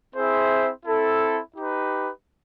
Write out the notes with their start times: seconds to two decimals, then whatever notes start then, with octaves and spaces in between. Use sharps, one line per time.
0.14 C4 E4 G#4 C5 E5
0.84 C4 E4 A4
1.55 D#4 G4 B4